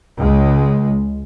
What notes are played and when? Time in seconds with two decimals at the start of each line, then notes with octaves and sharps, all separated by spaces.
0.18 C#2 G#3